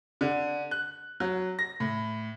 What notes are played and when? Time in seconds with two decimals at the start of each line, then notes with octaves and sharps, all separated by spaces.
0.21 D3
0.71 F#6
1.20 F#3
1.59 A#6
1.80 A2